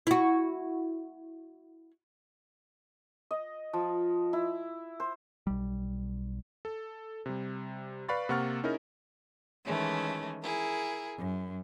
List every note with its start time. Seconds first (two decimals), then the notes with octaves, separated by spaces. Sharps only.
0.07 E4 F#4
3.31 D#5
3.73 F3
4.33 E4
5.00 C5
5.47 B1 G3
6.65 A4
7.26 C3 G3
8.08 B4 D5 F5 B5 C#6 A6
8.29 C3 A#3 F#5 C#6 F6 A6
8.63 C#4 D#4 E4 G#4 A#4
9.66 D#3 E3 G#3 A3 C#4
10.42 E4 G#4 A#4
11.17 F#2